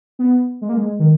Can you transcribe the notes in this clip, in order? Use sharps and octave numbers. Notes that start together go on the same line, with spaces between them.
B3
G#3
A#3
G#3
D#3